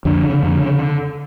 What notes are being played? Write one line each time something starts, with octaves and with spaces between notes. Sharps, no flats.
F2 D3
C#3
F2
C#3